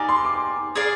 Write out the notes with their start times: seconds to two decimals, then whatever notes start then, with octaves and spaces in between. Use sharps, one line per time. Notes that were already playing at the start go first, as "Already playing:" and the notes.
Already playing: D#4 G4 D5 F5 G#5
0.09 C6
0.25 D6
0.75 G#4 D5 F5